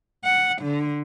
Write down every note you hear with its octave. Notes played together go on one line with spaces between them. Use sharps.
F#5
D3